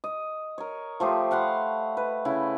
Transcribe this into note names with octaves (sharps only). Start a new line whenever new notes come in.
D#5
A#4 C#5
F3 A3 G4 C5
F5 F#5 B5 C6
B4
C#3 E4